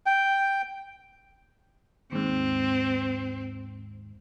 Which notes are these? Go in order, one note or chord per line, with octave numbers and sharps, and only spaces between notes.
G5
D#2 G#2 C4